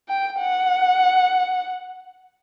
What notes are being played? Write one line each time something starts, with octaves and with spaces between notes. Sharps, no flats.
G5
F#5